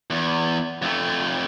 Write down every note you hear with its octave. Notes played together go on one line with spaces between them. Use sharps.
E2
F2 A3